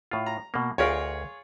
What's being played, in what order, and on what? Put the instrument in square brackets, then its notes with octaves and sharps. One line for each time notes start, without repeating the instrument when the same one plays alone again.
[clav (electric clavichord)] A2 F4
[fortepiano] A#5
[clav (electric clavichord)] B2 A#3
[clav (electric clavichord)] D2 G4 A#4 [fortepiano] F4 G#4 C#5